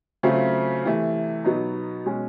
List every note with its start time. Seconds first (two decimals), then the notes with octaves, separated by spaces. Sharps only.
0.23 C#3 F#3 A3 C4 F4
0.84 C3 E3 A3
1.44 B2 F#3 B3 D#4
2.06 B2 G#3 C#4